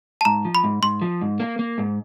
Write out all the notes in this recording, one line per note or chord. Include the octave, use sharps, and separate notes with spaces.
A5
G#2 A#5
F3
B5
G#2
G#2 C6
F3
G#2
A#3
A#3
G#2